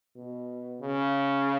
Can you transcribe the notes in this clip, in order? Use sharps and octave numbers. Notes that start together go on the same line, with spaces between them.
B2
C#3